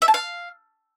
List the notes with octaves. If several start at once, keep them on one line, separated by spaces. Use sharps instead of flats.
E5
A5
F5